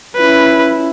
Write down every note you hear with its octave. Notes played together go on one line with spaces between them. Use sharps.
C#4 E4 B4